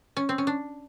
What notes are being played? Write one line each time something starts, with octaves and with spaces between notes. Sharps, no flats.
C#4
C4
C#4
D4